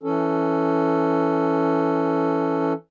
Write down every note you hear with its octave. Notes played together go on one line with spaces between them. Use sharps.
E3 C#4 A4